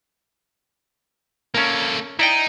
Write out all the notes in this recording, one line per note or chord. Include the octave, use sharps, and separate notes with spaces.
A#3 C#4 A4 A#4
D#4 E4 D5 G5